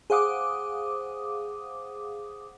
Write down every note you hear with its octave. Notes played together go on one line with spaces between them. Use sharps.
G#4 C5 F5 F#5 D6 D#6